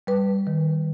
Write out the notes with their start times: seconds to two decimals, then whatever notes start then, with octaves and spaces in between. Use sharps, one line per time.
0.07 G3 B4
0.47 D#3